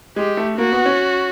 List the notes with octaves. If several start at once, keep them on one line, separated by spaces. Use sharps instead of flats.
G#3 G4
A3
A#3 F#4
B3
C#4